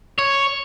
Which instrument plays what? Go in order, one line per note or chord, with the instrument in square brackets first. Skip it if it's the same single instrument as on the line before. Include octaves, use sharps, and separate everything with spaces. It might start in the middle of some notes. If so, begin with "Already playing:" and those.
[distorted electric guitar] C#5